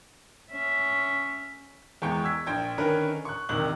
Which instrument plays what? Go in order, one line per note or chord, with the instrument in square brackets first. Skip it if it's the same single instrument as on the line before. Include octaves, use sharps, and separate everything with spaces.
[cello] C#4 E5
[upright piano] E2 G#3 B3 G5 C#6
E6 G#6 B6
A#1 G5 G#6
D3 D#3 C#4 A#4 B4
C#6 F#6
E1 C3 D#3 F#6 F#7